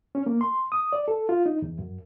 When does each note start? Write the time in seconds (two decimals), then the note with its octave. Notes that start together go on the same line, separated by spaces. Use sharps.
0.15 C#4
0.26 A#3
0.41 C6
0.72 D#6
0.93 D5
1.08 A4
1.29 F4
1.46 D#4
1.62 E2
1.79 F#2